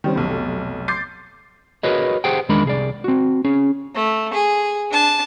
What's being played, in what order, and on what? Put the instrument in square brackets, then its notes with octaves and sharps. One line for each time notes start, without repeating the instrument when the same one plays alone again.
[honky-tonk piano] D#3 G3 C4 C#4
F1 B1
C6 D6 G6 A6 C7
[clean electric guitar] F#4 G#4 A#4 B4 C#5 D#5
G4 G#4 C5 F#5 G5
E2 D#3 G#3 D4 A#4 B5
C2 G#4 D5
C4 F#4
C#4 G#4
[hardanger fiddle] A3
G#4
D4 A5